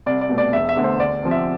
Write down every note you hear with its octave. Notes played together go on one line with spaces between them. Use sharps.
C2 D5
D5
B2 A3
D5
E1 E5
E5
E2 D3 A3
C5
D2 D5
C3 F3
E5